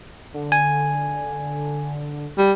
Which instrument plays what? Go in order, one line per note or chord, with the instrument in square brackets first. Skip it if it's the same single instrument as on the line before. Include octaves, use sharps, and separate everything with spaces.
[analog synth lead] D3
[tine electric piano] G#5
[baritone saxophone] G3